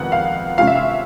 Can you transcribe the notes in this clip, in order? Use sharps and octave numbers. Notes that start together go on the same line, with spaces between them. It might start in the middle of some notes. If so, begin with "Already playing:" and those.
Already playing: F2 C3 D#3 G#3 B3 F#5
F5
C3 F3 G#3 C#4 F5
E5
F5